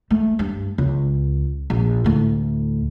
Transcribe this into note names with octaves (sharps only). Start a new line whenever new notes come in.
A3
G2
C#2
A#1
D2 A2